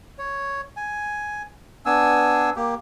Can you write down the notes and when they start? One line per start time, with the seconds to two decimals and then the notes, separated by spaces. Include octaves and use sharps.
0.18 C#5
0.77 G#5
1.86 B3 D4 G#5 E6
2.56 A#3 G4